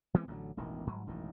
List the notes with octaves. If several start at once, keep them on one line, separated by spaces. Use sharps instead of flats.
E3 G#3 B3 C4
A1 D3 F#3
E1 A1 B2 D#3
G1 G#2 F#3
E1 A1 F#2 D#3